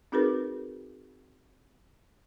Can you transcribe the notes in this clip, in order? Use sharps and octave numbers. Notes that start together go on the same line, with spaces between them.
C4 D#4 F#4 G#4 A#4 B4